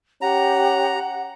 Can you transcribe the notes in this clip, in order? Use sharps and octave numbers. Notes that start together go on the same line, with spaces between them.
C#4 G4 F#5 A#5